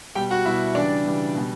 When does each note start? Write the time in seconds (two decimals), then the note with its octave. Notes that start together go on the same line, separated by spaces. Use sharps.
0.15 B2 G3 G4 G5
0.30 F#4 F#5
0.45 B2 G3 E4 E5
0.75 C#3 E3 G3 D4 D5
1.05 C#3 E3 G3
1.35 B2 G3